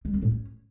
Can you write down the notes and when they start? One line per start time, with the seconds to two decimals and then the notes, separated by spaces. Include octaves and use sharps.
0.05 G3
0.14 C4
0.22 A2
0.31 C#4